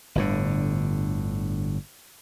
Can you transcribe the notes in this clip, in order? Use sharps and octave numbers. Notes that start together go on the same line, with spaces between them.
G1 A2 D3